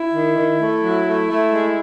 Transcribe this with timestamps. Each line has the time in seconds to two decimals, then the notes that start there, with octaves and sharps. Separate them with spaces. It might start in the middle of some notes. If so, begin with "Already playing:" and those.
Already playing: E4
0.14 D#3
0.37 D#3
0.61 A3
0.84 F#3
1.06 A3
1.30 A3
1.52 G#3